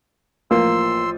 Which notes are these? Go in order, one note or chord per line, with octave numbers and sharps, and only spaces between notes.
A1 F3 A#3 C6 E6